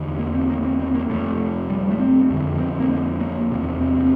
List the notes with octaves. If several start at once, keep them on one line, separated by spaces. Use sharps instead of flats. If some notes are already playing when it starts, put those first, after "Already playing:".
Already playing: E2 D3
A#3
C4
A#3
C4
C4
A#3
F2 C3 A3
G3
G3
A3
C4
F2 D3
C4
C4
A#3
C4
A#3
E2 C3
C4
C4